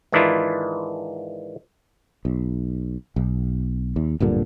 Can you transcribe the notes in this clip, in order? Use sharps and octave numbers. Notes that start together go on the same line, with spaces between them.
G#2 D#3 E3 D4 E4 F4
B1
B1
D#2
D1 G2 A#2 D3